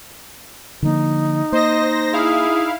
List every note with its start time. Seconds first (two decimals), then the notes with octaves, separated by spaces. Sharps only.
0.82 D3 F3 A#3 D#4
1.52 A#3 C5 D#5 A#6
2.13 E4 G#4 F5